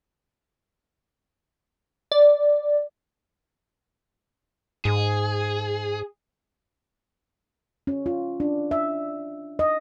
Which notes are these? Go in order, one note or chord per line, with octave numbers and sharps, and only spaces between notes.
D5
G#2 G#4
C#4
F4
D4
E5
D#5